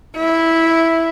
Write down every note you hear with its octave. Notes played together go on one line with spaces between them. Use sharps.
E4